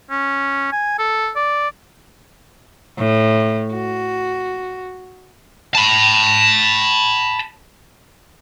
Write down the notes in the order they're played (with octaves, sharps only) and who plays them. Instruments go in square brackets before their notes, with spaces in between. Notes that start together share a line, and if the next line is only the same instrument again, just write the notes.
[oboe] C#4
G#5
A4
D5
[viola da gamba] A2
F#4
[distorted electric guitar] A5 B5